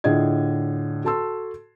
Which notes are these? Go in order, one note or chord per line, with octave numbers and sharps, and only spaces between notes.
A2 D3 F4 G#4 D#5 G#6
F#4 A4 A5 C6 E6